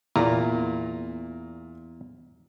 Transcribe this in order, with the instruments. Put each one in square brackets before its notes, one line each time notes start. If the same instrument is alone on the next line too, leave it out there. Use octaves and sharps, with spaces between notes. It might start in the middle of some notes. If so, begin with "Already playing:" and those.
[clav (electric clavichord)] E2 [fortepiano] A#2 A#5